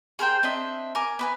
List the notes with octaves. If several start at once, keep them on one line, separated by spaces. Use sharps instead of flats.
G#4 A#4 C5 G5
C4 D4 D#5 E5
A#4 G#5 D6
B3 B4 G#5